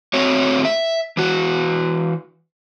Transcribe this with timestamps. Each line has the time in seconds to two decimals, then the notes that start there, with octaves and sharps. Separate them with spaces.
0.14 A3 C4 F#4 C#5
0.65 E5
1.17 E3 F#4